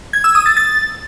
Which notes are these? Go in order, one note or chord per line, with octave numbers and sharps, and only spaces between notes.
G#6
E6
D#6
A6
A6